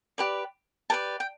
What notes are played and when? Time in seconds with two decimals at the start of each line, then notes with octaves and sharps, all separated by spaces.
0.18 G4 B4 D5
0.90 G4 B4 D5 A5
1.20 G5